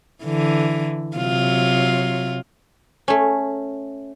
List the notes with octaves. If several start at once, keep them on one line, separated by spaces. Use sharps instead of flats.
D3 E3
C3 F#3 F4
A3 C#4